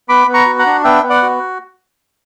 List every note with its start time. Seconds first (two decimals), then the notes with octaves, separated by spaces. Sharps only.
0.09 B3 B5 D6
0.28 B3
0.34 A#5 C#6
0.46 F#4
0.59 F#5 A#5
0.66 D4
0.84 B3 E5 G5
1.03 B3
1.10 D5 F#5
1.22 F#4